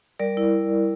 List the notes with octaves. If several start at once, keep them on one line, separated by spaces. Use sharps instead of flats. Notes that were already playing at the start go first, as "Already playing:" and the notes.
G3 A#4 D5
E4